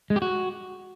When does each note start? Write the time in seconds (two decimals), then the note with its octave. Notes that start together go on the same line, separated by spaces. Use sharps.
0.10 G#3
0.16 G4
0.22 F#4